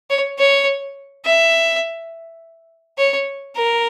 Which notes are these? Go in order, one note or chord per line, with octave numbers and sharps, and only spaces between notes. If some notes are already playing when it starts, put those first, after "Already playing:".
C#5
C#5
E5
C#5
A#4